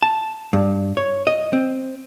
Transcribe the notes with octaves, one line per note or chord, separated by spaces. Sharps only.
A5
G2
C#5
D#5
C4